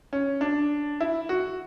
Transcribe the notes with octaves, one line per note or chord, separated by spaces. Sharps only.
C#4
D4
E4
F#4